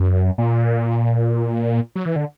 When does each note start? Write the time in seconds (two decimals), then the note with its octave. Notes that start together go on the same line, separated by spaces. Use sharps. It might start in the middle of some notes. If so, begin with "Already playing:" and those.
Already playing: F#2
0.38 A#2
1.95 F#3
2.06 E3
2.16 D3